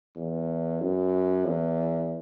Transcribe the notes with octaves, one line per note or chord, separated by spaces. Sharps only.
E2
F#2
E2